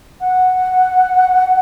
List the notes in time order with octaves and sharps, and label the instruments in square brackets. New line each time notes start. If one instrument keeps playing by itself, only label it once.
[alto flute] F#5